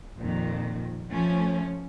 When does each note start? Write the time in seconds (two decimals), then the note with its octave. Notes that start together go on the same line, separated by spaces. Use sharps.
0.20 F2 A#2 D#3
1.11 F3 A3 C#4